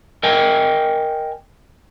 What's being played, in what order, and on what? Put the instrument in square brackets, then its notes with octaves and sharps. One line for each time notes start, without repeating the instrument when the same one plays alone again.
[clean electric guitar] A#4 D#5 G5 G#5